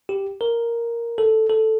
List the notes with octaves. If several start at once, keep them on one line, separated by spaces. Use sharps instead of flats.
G4
A#4
A4
A4